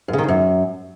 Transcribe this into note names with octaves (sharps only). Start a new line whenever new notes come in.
F#2
C#3
D#3
C#3
F#2